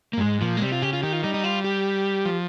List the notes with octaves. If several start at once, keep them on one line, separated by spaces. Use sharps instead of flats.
A#3
G2
G#2 G#3
A#2 F3
G#3
C3 G3
F4
C#3 G4
F4
D#3 G4
F4
G3 D#4
D#4
F4
G4
F3